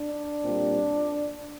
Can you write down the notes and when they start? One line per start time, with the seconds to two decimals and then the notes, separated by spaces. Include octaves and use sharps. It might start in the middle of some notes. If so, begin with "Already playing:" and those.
Already playing: D4
0.43 A#2 G3 C4